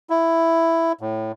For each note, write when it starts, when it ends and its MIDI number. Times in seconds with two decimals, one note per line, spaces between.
0.10 0.92 64
1.01 1.32 45